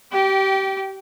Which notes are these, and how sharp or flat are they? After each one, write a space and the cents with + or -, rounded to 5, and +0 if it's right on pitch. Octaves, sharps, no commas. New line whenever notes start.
G4 -25 G5 -10